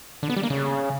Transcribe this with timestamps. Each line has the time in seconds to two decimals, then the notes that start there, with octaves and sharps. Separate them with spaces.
0.23 D3
0.30 B3
0.36 G3
0.43 A#3
0.50 C#3